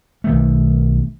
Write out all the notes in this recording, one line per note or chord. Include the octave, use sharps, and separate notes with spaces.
B1 D#3 A3